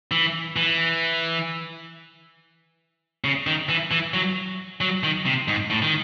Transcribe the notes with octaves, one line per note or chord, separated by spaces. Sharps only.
E3
E3
C#3
D#3
E3
E3
F#3
F#3
D#3
C3
G#2
A2
D#3